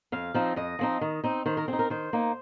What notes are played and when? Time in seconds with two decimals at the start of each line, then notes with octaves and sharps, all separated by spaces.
0.12 F2 F5
0.34 F3 C4 D#4
0.56 F2 D#5
0.79 F3 C4 D#4
1.01 D#3
1.24 C4 D#4
1.46 D#3 C5
1.57 A#4
1.68 C4 G#4
1.73 D#4
1.79 A#4
1.90 D#3 C5
2.13 A#3 D#4